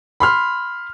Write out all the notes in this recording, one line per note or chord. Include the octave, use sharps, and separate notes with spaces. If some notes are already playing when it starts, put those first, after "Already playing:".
B5 C6 F6